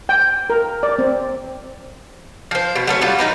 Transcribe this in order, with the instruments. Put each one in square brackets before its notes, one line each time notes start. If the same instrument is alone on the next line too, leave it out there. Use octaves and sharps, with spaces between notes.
[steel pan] G5
A#4
D5
C4
[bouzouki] F3 C5
B2
F#3 A3 C#4
G3 F4 F#4
E3 D#4 A#4 B4